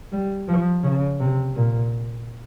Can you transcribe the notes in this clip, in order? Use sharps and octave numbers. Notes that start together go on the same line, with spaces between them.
G3
F3
C#3
C3
A#2